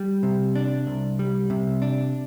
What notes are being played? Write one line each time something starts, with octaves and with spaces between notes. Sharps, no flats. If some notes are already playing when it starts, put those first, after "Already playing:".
Already playing: G3
C3
D4
C2
G3
C3
D4